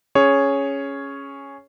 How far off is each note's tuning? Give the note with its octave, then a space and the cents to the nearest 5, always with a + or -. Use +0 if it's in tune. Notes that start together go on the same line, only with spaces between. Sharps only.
C#4 +0 G#4 +0 C#5 +0